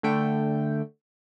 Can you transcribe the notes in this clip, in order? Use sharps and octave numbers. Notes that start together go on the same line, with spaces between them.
D3 A3 G5